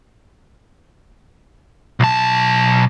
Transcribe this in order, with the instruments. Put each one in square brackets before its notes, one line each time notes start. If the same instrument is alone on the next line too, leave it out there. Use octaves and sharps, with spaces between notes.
[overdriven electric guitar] B1 A5